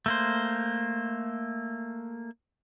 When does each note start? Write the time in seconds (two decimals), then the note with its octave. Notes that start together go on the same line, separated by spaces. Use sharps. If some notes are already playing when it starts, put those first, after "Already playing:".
0.06 A3 A#3 C5